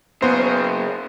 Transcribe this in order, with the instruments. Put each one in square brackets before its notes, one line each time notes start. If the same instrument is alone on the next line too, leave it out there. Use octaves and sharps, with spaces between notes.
[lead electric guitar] C#3 F#3 [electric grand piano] B3 C5